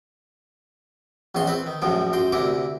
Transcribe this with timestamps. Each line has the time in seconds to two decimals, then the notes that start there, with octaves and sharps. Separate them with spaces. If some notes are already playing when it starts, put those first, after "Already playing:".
1.35 A#1 E2 C#4 G#5 C6
1.47 C4 B4 B5
1.66 D#3
1.82 A#1 F#2 A2 F3 G5
2.13 F#2 G5 C6
2.32 D2 C3 A#3 E4 D6